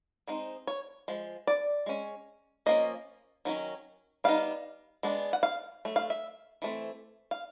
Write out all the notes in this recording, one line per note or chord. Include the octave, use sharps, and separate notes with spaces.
G#3 C4 D#4
C#5
F3 G#3
D5
G#3 C#4
F3 A#3 C#4 D#5
D#3 F#3 C#4
G3 B3 D#4 F5
G#3 B3 D4
F#5
F5
F#3 A3
F5
E5
E3 A3 C4
F5